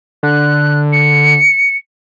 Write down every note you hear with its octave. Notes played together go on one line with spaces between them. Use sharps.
D3 F#6
C#7